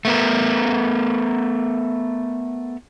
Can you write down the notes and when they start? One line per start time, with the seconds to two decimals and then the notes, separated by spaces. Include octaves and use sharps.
0.05 A3 B3 A#4